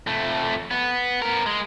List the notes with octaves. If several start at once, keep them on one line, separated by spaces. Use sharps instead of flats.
F2 A3
B3
B3 A#4
G#3